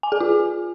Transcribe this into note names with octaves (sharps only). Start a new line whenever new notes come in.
G#5
G#4
F4